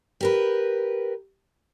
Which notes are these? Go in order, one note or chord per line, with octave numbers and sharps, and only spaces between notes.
G4 A#4 B4